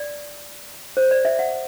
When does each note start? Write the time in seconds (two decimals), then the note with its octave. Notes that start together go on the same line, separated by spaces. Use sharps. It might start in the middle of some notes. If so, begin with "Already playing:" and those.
Already playing: D5
0.97 C5
1.11 D5
1.25 E5
1.39 F#5